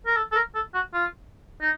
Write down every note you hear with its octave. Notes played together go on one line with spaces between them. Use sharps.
A#4
A4
A4
A#4
A4
F#4
F4
D#4